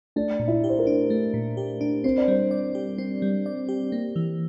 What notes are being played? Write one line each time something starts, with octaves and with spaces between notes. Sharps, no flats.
A3 D4
A#2
E4
G4
C5
A#4
D4
A3
A#2
G4
D4
C4 C5
D5
G3 C5
D5
G4
C4
G3
D5
G4
A#3
E3